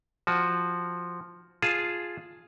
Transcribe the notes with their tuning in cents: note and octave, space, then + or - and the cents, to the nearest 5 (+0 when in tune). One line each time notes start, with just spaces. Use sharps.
F3 +0 F#4 +0
F4 +0 G#4 +0 A5 +0